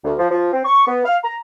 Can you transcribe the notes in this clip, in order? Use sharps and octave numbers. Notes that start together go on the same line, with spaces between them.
D2
F3
F3
C4
C#6
B3
F5
A#5